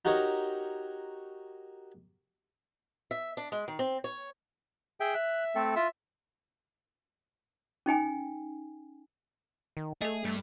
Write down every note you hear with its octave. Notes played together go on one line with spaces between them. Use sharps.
D#4 F#4 G4 A#4 C#5 D#5
E5
D4
G#3
D#3
C4
C#5
G#4 E5 G5
E5 F#6
A3 C4 A4
F4 E5
C#4 D#4 G5 G#5
D#3
A3 G#4 A4 D#5
G2 A3